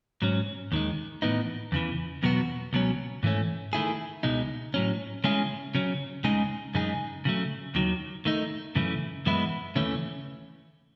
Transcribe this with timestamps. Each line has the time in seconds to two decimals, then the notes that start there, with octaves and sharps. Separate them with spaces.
0.22 G#2 F#3 C#4
0.72 D#2 D#3 G#3
1.22 A2 E3 B3 D#4
1.72 E2 C#3 E3
2.23 E2 B2 F#3 B3 F#4
2.73 C#2 B2 F#3 C#4
3.23 G#2 E3 A3 C#4
3.73 D#3 A3 E4 G#4
4.23 C#2 B2 G#3 D#4
4.74 A2 F#3 C#4
5.24 C#3 G#3 C#4 E4 G#4
5.75 C#3 F#3 C#4
6.24 C#2 C#3 G#3 D#4 G#4
6.74 F#2 C#3 G#3 D#4 G#4
7.25 C#3 F#3 A3
7.75 D#2 D#3 F#3
8.25 D#3 A3 D#4
8.75 F#2 C#3 E3 A3
9.26 F#2 E3 G#3 B3 E4
9.76 D#2 C#3 E3 A3 C#4